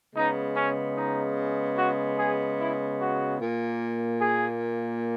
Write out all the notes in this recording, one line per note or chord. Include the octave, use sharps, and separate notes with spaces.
C#3 G#3 B3 D#4
C#4
D#4
F#4
G#4
E4
F#4
A#2 A#3
G#4